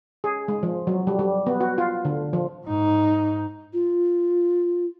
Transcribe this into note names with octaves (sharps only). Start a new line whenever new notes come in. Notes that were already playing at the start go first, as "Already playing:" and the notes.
G#4
G#3
F3
F#3
G3
G3
B3
F#4
F4
D3
F3
G#2 D#4
F4